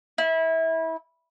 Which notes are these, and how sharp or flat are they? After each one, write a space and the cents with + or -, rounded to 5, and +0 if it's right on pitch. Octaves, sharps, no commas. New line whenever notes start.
E4 -25